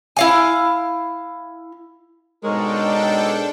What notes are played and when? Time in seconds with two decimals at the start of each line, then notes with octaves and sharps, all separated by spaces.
0.17 E4 F5 G#5
2.44 G#2 B2 G#3 D4 A4 A#4 C#5 G5